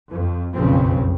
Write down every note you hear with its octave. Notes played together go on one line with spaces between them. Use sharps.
F2
F#1 B1 F2 C#3 F3 C4